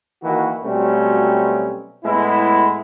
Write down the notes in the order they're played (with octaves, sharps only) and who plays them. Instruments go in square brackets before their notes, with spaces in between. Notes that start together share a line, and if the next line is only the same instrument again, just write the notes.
[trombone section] D#3 E3 A#3 F#4
B2 F#3 G3 A3 C4 C#4
A2 G#3 B3 E4